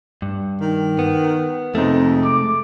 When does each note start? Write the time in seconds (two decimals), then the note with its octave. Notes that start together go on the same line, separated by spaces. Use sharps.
0.22 G2
0.61 D#3
0.99 B3
1.75 F2 C3 G#3 A3 D#4
2.24 D6